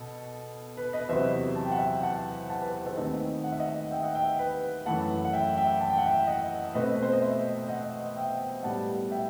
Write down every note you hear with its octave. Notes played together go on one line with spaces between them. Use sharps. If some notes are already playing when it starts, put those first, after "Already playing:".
Already playing: B2 A4
B4
B4 D#5
E2 C3 F#3 C5 E5
A5
G5
F#5
E5 G5
F#5 A5
F#5 A5
B4
B4
A4 C5
D#2 D#3 A3 C4 B4 D#5
F#5
E5
D#5 F#5
E5 G5
D#5 F#5
E5 G5
B4
F#2 E3 A3 F#5 A5
F#5
E5 G5
E5 G5
A5
G5
F#5
E5 G5
D#5 F#5
B2 A3 C4 B4 D#5
B4
C5
D#5
C5 E5
D#5 F#5
E5 G5
A2 G3 B3 F#5 A5
E5 G5